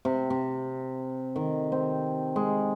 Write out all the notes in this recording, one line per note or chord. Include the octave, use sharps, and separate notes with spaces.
C3
C3
D#3
C4
G#3